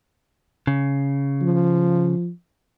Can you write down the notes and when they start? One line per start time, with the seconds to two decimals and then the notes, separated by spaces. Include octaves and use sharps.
0.67 C#3
1.41 F3